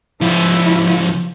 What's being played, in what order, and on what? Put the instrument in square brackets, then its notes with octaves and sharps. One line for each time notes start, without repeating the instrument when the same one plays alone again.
[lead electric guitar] C#2 F3 [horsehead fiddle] E4